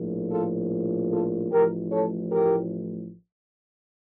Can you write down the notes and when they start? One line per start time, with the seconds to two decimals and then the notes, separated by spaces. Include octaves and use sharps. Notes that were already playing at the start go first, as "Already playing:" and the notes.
Already playing: A#1 A2 F3
0.31 F4 A4
1.11 F4 A4
1.52 A1 A2 F3 G4 A#4
1.91 A4 C#5
2.32 G4 A#4